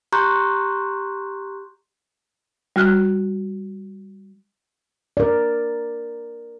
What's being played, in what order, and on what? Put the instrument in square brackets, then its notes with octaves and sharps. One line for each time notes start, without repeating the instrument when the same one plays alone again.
[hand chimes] G4 A#5 C6 C#6 F#6 G6
[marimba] G3 F#4 F6 F#6
[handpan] A#4 D5